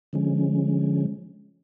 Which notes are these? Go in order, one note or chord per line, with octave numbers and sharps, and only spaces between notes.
D3 F3 G#3 C#4